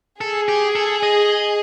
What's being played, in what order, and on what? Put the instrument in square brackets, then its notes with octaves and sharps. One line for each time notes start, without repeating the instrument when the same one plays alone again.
[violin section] G#4 [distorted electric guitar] A4
[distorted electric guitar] G4
A4
D#5